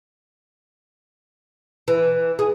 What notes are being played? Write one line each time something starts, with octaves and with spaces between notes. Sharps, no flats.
E3
G#4